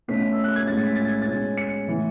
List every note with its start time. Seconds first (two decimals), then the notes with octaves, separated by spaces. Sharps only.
0.08 B2 A3 C#4 B6
0.32 E6
0.44 F#6
0.56 G#6
0.67 A2 G#3 C#4 A6
0.83 B6
0.95 A6
1.08 G#6
1.22 A6
1.27 B2 G#3 C#4
1.57 C#7
1.87 A2 E3 B3